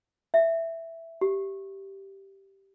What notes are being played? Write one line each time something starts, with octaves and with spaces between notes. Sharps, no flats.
E5
G4